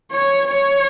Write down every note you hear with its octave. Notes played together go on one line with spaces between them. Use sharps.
C#5
C#5